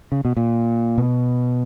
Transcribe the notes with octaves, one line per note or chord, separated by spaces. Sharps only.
C#3
B2
A#2
B2